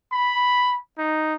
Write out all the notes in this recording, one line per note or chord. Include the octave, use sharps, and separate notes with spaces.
B5
D#4